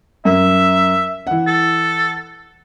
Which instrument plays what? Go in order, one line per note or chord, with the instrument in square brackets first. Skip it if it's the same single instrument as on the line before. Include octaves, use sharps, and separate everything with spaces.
[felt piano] F#2 [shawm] E5
[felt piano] E3 F#5
[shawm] A4